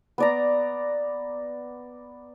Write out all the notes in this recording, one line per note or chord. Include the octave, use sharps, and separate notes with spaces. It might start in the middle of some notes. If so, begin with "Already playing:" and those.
B3 D5 A#5